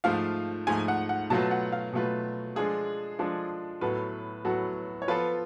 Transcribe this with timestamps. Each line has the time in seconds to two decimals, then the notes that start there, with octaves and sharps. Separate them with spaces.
0.04 G#2 F3 A3 F5
0.67 G#2 F3 A3 G#5
0.88 F#5
1.09 F#5
1.30 B2 F#3 A3 F4 B4 A5
1.51 F#5
1.72 F5
1.93 B2 F#3 A3 F4 B4
2.56 F3 G#3 D4 F4 G#4 A4
3.19 F3 G#3 D4 F4 A4
3.81 A2 F#3 B3 F#4 A4 B4
4.45 A2 F#3 B3 F#4 A4
5.02 C#5
5.08 F3 B3 F4 A4 B4